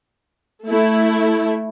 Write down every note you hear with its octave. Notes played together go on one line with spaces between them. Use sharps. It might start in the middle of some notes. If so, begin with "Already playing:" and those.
A3 E4